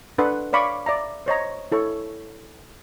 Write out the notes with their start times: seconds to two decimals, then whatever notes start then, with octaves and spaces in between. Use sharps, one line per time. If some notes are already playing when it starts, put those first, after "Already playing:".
0.18 D4 A4 B4 F#5 C6
0.53 C#5 D5 F5 B5 C#6 D6
0.86 D5 E5 A#5
1.26 C5 C#5 D#5 A#5
1.72 E4 A4 C#5 C#6